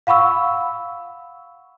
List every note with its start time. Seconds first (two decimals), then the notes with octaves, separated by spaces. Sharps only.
0.07 F5 F#5 B5 C#6 E6